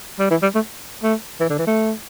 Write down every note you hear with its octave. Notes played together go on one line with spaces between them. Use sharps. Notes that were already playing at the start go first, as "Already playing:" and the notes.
G3
E3
G3
A3
A3
E3
D3
E3
A3